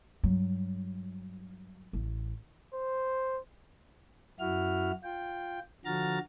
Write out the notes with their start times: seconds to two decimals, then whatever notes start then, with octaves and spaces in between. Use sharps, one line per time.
0.23 G2 F#3
1.93 A1
2.73 C5
4.40 F#2 E4 F#4 F6
5.04 F4 G5
5.85 D3 F3 F#4 A#5 F6 A6